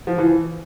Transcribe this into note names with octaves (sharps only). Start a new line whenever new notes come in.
F3
E3